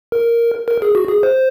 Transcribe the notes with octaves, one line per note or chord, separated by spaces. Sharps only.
A#4
A#4
G#4
F#4
G#4
C5